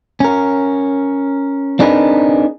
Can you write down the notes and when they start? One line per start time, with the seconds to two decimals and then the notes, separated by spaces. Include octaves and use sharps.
0.20 C#4 A#4
1.79 C4 D4 D#4 G#4 A#4 B4